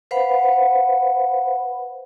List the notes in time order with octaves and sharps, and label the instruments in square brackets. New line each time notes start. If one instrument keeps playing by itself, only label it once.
[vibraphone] B4 C5 F5 F#5 B5